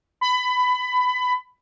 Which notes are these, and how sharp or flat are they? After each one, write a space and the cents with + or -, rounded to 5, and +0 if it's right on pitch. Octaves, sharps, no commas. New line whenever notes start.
B5 +20